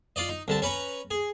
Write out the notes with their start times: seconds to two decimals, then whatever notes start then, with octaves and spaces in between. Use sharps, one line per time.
0.16 F4 D5 D#5
0.29 D#4
0.48 C2 D3 A5
0.62 C#4 B4 C#5 A#5
1.11 G#4